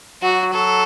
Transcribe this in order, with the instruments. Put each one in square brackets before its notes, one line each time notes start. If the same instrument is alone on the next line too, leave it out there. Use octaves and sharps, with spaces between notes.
[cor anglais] F#3 [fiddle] F#4
[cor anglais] F#3 [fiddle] A4